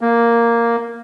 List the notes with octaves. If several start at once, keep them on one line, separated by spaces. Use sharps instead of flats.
A#3